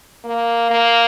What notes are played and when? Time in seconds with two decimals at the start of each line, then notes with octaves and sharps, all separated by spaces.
0.25 A#3
0.71 A#3